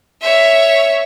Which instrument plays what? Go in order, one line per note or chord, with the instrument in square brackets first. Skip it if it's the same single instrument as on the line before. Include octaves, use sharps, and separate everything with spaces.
[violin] C#5 E5